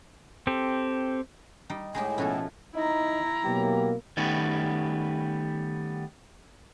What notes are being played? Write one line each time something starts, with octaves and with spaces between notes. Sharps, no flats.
C4 G4 A4
G3 D#4
A2 G#3 D#4 G4 G#5
B2 F3 C#4 E4 F#4 A4
D#4 E4 A#5
B2 F#3 A#3 G4
D#3 G3 A3 B3 C#4